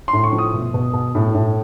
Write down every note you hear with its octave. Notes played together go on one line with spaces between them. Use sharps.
C6
A2
C#6
F3
D#6
B2
B2
B2
A2
A2